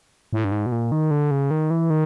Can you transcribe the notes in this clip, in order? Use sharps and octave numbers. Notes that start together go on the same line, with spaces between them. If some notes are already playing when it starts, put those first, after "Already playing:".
A2
G2
G#2
B2
A#2
D#3
D3
C#3
D#3
E3
D#3